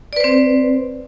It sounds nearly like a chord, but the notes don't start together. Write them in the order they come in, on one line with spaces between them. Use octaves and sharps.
D5 B4 C5 C4